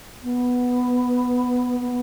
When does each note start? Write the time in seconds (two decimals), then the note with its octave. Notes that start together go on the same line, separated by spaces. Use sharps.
0.23 B3
1.79 B3